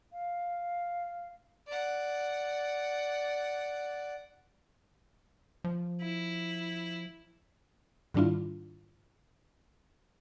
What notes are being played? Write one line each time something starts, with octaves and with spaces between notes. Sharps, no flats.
F5
D5 F#5
F3
E4
G#2 D#3 G3 D4 E4 F4